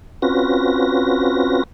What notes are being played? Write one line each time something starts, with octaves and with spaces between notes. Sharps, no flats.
C4 C#4 F4 F#4 B4 A#6